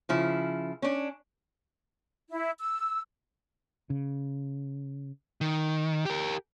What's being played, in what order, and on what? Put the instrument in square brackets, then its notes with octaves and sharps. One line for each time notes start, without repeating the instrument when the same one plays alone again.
[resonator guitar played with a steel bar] C#3 F3 E4
C#4 D4
[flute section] E4
E6
[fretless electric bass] C#3
[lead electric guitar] D#3
G4 A#4